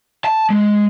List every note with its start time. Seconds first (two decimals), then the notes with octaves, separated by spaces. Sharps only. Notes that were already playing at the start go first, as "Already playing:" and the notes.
0.25 A5
0.50 G#3